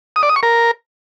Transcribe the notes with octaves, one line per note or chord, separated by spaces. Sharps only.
D#6
D5
D#6
C#6
A#4